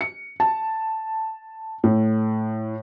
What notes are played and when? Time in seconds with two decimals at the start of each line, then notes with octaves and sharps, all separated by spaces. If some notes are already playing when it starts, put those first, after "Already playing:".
0.01 C#7
0.40 A5
1.84 A2